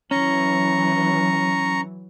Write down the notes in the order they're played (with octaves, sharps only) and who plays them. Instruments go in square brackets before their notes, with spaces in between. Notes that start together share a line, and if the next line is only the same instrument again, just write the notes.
[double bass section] E3 F#3 [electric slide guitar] C#4 [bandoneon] A#5 C#6